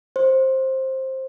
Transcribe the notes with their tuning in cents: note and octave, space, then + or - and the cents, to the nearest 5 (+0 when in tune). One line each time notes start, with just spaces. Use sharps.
C5 +15